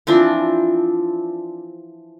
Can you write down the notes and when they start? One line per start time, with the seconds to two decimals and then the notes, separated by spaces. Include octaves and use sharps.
0.07 E3 F3 C4 D4